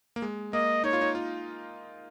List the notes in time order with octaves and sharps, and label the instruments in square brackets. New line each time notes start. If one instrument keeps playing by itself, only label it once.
[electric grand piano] A#3
G#3
[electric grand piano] A#3 [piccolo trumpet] D#5
[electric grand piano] D#4 [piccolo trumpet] C#5
[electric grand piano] F4
D#4
F4